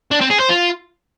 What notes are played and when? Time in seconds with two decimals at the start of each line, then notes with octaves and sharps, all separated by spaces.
0.11 D4
0.21 C4
0.31 G#4
0.41 C5
0.50 F4